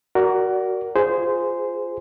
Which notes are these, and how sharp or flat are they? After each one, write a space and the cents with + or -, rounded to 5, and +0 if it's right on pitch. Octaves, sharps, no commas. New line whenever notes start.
F#4 +15 A#4 +0 D5 -20
F4 +0 G#4 +0 C5 -15